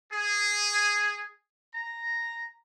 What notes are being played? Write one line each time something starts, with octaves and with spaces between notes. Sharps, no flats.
G#4
A#5